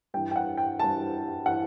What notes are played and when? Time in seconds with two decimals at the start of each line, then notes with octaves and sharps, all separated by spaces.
0.14 G2 E3 G5
0.31 G5
0.36 F#5
0.58 G5
0.80 G2 E3 A5
1.46 E3 F#5